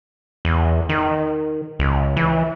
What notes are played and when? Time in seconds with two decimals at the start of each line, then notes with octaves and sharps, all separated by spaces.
0.45 E2
0.89 D#3
1.79 C#2
2.17 E3